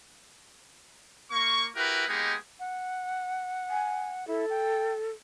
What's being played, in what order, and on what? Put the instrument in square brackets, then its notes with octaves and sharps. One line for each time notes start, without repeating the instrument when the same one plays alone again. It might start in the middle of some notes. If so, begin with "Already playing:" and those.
[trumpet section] A#3 C#6
E4 F#4 G4 A#4 B4
G#3 A#3 B3 D#4 G4 G#4
[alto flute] F#5
[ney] G#5
[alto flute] E4 [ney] A4
[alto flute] G5